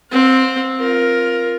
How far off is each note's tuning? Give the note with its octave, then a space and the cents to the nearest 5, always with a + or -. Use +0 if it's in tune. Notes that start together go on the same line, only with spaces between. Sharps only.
C4 +0 F5 +45
F4 +0 A#4 +10